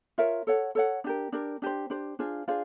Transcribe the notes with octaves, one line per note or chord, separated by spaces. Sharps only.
F4 A#4 C#5 E5
A4 C#5 F#5
A4 C#5 F#5
D4 G4 A#4
D4 G4 A#4
D4 G4 C5
D4 G4 C5
D4 F4 G#4 C5
D4 F4 G#4 C5